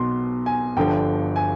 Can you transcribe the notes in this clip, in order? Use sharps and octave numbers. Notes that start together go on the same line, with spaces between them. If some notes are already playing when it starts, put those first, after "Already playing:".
Already playing: B1 B2 C6
G#5
G1 G2 D3 F3 G5
G#5